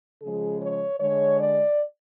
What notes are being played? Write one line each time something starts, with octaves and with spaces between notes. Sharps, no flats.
C#3 F3 G#3 G#4
C#5
D3 G#3 C#5
D5